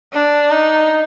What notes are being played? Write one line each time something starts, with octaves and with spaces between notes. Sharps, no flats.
D4
D#4